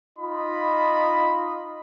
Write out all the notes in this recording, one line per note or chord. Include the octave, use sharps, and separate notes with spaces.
D#4 F4 D#5 B5